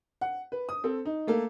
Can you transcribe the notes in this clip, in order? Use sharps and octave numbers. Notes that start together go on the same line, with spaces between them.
F#5
B4
D#6
C4 A4
D#4
A3 A#3 A4